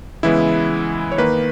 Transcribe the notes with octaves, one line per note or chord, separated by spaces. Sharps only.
C#3 E3 G#3 B3 E4
C#5
D#3 A#3 B4